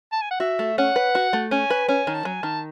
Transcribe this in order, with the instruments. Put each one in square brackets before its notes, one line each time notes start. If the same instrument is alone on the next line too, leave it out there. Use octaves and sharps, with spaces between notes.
[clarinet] A5
G#5
F#5
[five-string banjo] F#4 [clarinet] E5
[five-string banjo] A3
[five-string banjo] C#4 [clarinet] F#5
[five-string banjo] B4
F#4
A3
[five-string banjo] C#4 [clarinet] G#5
[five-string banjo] B4
[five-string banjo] C#4 [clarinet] G#5
[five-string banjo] D#3
[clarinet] A5
[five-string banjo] F#3 [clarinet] G#5
[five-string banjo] D#3 [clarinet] A5